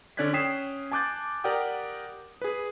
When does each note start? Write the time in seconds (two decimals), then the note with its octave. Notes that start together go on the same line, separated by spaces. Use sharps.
0.17 D3 C#4 D5 F#6 G#6 B6
0.33 C#4 G5 D#6 B6 C7 E7
0.92 G#5 A5 D6 F#6 G6 A6
1.44 G4 A#4 D5 F#5 G5 D#6
2.42 G#4 B4